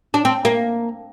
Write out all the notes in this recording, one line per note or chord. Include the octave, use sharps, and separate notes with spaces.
D4
C4
A#3